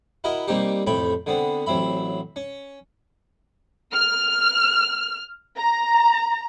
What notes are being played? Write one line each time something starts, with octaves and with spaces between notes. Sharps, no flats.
E4 F#4 A#4 D#5 E5
G3 A#3 C4 D#4 G4
A1 F2 A3 G5 B5
D3 B3 C4
A1 F#3 C4 E5 B5
C#4
F6
A#5